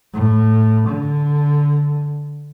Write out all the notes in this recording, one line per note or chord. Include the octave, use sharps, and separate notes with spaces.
A2
D3